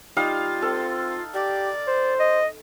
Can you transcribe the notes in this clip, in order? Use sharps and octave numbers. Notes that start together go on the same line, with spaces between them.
G3 D#4 F4 F5
C4 A4
G4 D5
C5
D#5